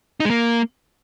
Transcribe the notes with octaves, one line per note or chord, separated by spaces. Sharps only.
D#4
G#3
A#3